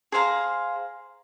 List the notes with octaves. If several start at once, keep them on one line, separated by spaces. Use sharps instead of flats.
G#4 C5 F5 A#5